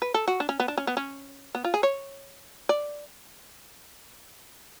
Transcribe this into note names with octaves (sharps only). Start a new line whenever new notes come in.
B4
A4
F#4
D4
C#4
B3
D4
C#4
B3
C#4
B3
F4
G#4
C#5
D5